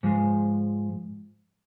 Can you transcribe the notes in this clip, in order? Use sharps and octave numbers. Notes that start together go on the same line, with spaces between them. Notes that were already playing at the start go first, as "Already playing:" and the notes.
G#2 F3 G#3